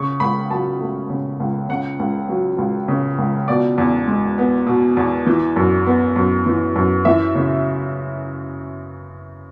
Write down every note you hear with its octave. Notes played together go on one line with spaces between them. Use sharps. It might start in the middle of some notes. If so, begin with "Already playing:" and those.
Already playing: C#3 C#6
C#2 B5
F#3 A5
A3
C#3
C#2
C#3 F#5
C#2
F#3
C#2
C#3
C#2
B2 D5
E2
G#3
B3
B2
E2
E3
F#2
B3
F#2
E3
F#2
E3 E5
C#3